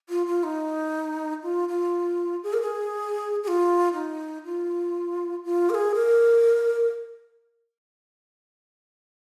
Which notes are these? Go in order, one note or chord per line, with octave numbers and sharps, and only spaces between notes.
F4
F4
D#4
F4
F4
G#4
A#4
G#4
G#4
F4
D#4
F4
F4
A#4
G#4
A#4